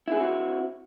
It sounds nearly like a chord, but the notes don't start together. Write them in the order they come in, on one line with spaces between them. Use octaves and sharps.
E4 G#4 C4 F#4